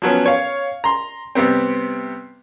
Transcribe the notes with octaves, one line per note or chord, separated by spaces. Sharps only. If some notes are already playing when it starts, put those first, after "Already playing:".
F3 F#3 B3 C#4
C#5 F5
A#5 C6
C3 G3 B3 C4